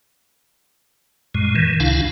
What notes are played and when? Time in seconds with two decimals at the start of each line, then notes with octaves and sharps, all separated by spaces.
1.35 F#2 A#2 G#3
1.55 D#3 E3
1.80 C#2 C3 D4 E4 F5